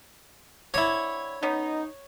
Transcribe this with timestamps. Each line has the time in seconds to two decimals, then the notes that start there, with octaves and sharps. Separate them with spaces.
0.74 D3 C4 E4 C#5
1.43 B3 C#4 D#4